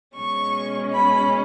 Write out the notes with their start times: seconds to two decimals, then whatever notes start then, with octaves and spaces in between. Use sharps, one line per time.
0.16 B2 G#3 C#4 C#6
0.92 B5